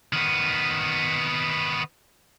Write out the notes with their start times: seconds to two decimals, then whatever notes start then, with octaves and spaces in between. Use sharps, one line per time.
0.13 D#3 B3